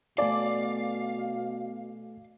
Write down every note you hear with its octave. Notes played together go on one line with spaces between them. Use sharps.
B2 A3 A4 D5 F5 G#5